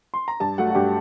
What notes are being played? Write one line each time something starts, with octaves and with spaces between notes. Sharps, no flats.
C6
A#5
G2 A5
F#3 A3 F#5
F#4
G2 G4